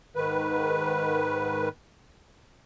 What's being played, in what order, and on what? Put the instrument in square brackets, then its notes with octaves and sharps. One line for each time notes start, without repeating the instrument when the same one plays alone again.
[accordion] G#2 D#3 B4